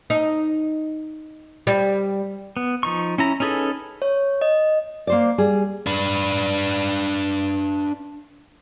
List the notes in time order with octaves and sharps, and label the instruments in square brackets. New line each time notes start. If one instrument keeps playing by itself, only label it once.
[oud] D#4
G3
[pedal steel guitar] B3
F3 D#4 C#6
C#4 E4 A#5
C#4 D#4 G#4 A4 B4
[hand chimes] C#5
D#5
[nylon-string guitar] A#3 C5 D5
G3 G#4
[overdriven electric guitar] D4 B4